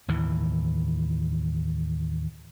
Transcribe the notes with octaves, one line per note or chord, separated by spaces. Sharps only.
D#2 A2 E3